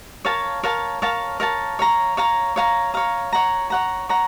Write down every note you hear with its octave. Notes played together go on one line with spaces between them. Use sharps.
A#4 C#5 F5 A5
A#4 C#5 F5 A5
A#4 C#5 F5 A5
A#4 C#5 F5 A5
C#5 F5 A#5
C#5 F5 A#5
C#5 F5 A#5
C#5 F5 A#5
C#5 F#5 A#5
C#5 F#5 A#5
C#5 F#5 A#5